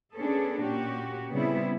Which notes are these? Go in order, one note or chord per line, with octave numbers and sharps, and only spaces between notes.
B3 C#4 D4 G#4 A4
A#2 C#4 F#4 G4
C#3 G3 B3 C4 E4